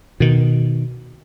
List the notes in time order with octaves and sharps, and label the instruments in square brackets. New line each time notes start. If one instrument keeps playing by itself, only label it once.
[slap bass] B2 D#3